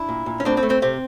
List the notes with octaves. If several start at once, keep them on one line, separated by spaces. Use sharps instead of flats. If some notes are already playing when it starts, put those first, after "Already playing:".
Already playing: D4 E4
A#2
A#2
C#4
A2 C4 D4
C4
A3
C4
C3 C4